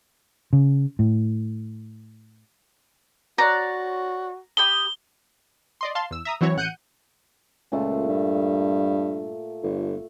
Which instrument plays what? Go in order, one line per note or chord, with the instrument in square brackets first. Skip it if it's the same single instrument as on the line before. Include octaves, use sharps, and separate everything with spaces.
[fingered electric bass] C#3
A2
[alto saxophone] F#4 [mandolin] C#5 D5 F#6 [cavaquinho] A#5
[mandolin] G4 B5 D#6 [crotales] G7
[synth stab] D5 D#5 C6
F5 A5 C6
E2 E6
E5 A#5 D#6
E3 F#3 C4 E4 F#4 C#5
A1 F#5 F#6 G6 C#7 D#7
[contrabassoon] C#2 [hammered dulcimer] A#2 A3
[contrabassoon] G2
G1